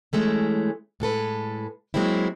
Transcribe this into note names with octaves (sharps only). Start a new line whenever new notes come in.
E3 G#3 A3 C#4
A2 G#3 A4 B4
F#3 G#3 A#3 C4 E4